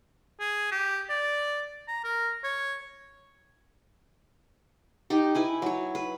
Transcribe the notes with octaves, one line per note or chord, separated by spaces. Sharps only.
G#4
G4
D5
A#5
A#4
C#5
D#4 G4
E4 B4 G#5
F#3 C#5
B4